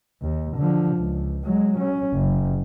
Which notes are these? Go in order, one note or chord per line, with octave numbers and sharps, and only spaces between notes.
D#2
D3 F3
C#2
F#3 G#3
C#4
F#1